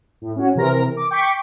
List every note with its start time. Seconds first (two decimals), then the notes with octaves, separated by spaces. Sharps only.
0.22 A2
0.36 C#4 F#4
0.55 C3 E3 A#4 A#6
0.97 D6
1.11 G5 C#6 D6 B6